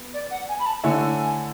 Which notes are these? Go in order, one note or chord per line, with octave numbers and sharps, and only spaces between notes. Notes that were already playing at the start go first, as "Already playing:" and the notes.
Already playing: B3
D5
F#5
G#5
B5
A5
D3 A3 E4 A4 C#5 G#5